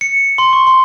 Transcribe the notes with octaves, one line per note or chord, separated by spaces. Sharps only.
C#7
C6
C#6
C6